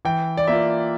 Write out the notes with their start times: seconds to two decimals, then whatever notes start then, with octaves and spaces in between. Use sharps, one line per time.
0.05 E3 G5
0.37 D5
0.47 A#3 F4 E5